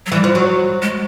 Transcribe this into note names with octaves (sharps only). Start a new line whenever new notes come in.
F#3
E3 G3
F3
F#3
G#3